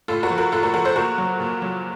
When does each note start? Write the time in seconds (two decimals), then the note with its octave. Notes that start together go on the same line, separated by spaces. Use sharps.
0.08 A2 F4 A4
0.23 F#4 A#4
0.30 F3
0.38 F#4 A#4
0.52 A2 F4 A4
0.63 F#4 A#4
0.74 F3 F#4 A#4
0.85 A4 C5
0.96 A#2 F#4 A#4
1.18 F#3
1.40 A#2
1.62 F#3